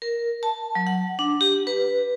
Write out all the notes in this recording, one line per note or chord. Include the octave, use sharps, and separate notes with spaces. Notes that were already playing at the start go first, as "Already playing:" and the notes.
A#4
A5
F#3
F#5
D4
G4
B4